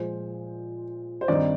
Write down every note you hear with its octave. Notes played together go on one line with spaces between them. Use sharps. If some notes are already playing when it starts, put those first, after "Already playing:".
Already playing: A#2 F3 G#3 C5
C5
G2 D#3 G3 C4 D#4 D5